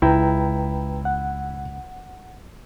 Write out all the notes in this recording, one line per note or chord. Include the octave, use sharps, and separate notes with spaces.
C#2 E4 B4 G5 A#5
F#5